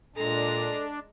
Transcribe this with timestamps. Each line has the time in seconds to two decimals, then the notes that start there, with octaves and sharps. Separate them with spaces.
0.16 A#2 G#3 D4 A4 A#5